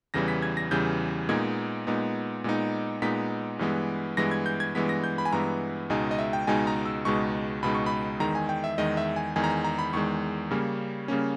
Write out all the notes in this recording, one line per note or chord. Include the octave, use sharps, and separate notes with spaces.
E2 C#3 E3 G3 A#6
B6
G#6
A#6
E2 C#3 E3 G3 G6
A#2 G#3 B3 D#4 G#6
A#2 G#3 B3 D#4
A#2 G#3 B3 D#4
A#2 G#3 B3 D#4 B6
G2 E3 G#3 B3
G2 E3 G#3 B3 A#6
G#6
G6
G#6
G2 E3 G#3 B3 B6
A#6
G6
B5
G#5
G2 E3 G#3 B3 A#5
C#2 B2 G#3 D#4 G#5
D#5
E5
G5
C#2 B2 G#3 D#4 G#5
A#5
E6
C#2 B2 G#3 D#4 C#6
C#2 B2 G#3 D#4 B5
C#6
B5
E2 D#3 G#3 A#5
G#5
G5
E5
E2 D#3 G#3 D#5
E5
G#5
E2 D#3 G#3 G#5
A#5
G#5
A#5
B5
E2 D#3 G#3 C#6
C#3 G3 A#3 C#4
C#3 G3 A#3 C#4